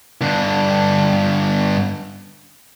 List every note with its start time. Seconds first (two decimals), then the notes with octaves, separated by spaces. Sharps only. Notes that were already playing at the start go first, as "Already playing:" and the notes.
0.21 G2 D3